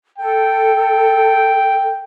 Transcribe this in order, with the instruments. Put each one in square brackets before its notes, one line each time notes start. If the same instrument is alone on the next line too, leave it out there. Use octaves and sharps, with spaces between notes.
[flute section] A4 [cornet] G5